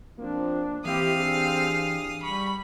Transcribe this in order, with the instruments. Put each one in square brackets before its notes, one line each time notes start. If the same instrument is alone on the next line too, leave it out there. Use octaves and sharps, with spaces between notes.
[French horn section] F3 C4 [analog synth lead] A#3 [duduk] D4
[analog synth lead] E3 [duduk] C4 [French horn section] E4 G4 [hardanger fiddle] F5 D#6
[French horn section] D4 G4 G#4
[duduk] G3 [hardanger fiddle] B5 [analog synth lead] C#6